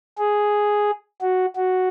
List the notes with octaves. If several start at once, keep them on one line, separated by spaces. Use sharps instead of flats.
G#4
F#4
F#4